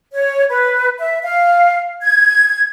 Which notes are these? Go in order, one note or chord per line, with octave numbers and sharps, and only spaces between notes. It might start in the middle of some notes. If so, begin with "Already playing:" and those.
C#5
B4
E5
F5
G#6